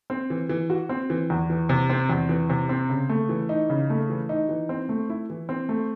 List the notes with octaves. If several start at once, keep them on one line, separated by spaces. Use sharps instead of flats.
C4
E3
E3
F#4
C4
E3
E2
E3
C3
C4
E2
E3
C3
C4
C#3
A3
E3
D#4
C#3
A3
E3
D#4
E3
C4
A3
E4
E3
C4
A3